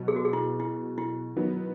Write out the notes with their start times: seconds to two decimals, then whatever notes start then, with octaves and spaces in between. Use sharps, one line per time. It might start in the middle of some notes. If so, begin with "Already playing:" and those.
Already playing: B2 F#3 B3
0.08 G#4
0.16 F#4
0.25 G#4
0.33 E4
0.60 E4
0.98 E4
1.36 D#3 F#3 B3